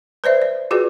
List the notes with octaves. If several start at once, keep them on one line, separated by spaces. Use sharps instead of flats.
B4 C5 D5 E5
D5
F4 F#4 G#4 B4 D5